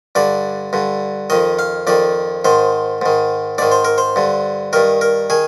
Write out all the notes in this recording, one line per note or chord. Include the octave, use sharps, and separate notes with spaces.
G2 D3 D5
G2 D3
F2 D#3 D#5
F5
F2 D#3 D5
G#2 D#3 C5
G#2 D#3
G#2 D#3 D5
C5
A#4
C5
G2 D3
G2 D#3 A#4
A#4
D#3 G#4